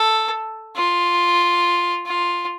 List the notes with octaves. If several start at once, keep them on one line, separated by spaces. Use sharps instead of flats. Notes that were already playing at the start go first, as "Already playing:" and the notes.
Already playing: A4
F4
F4